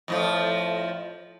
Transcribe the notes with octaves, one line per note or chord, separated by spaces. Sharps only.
F2 A2 F3